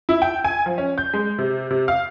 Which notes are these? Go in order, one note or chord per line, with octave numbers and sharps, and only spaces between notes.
E4
G5
G#5
F3
C#4
G6
G#3
C3
C3
F5